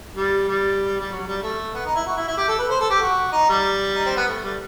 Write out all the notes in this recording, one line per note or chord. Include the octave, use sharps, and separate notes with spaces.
G3
G3
G3
F#3
G3
A3
B3
D#4
E4
F#4
E4
E4
G4
A4
B4
C5
A4
G4
F#4
D#4
G3
D#4
C4
B3
A3
G3